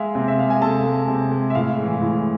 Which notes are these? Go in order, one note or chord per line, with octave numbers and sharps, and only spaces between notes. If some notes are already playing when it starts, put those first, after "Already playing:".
Already playing: G#3 G#4 E5 F5
C3
E5
G#3 F5
G#5
C3 A4 A5
G#3
C3
G#3
E5
A2 F5
E3 G#3
A2